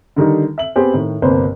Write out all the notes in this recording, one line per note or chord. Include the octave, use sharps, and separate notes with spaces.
D3 D#3 G3 D#4
E5 F#7
B3 C4 G4 G#4 B4 C5
A2 D#3
G1 C2 A#3 B4 C5